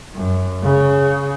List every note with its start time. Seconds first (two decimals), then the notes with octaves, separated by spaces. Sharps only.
0.15 F#2
0.63 C#3